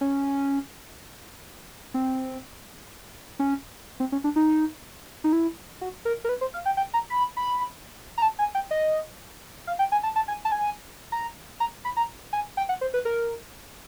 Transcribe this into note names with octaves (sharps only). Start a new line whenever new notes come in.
C#4
C4
C#4
C4
C#4
D4
D#4
D#4
E4
F#4
A#4
A#4
B4
C5
F5
G5
G5
A#5
B5
B5
A#5
A5
G#5
G5
D#5
F5
G5
G#5
A5
A5
G#5
A5
G#5
A#5
A#5
B5
A#5
G#5
G5
F#5
C5
B4
A#4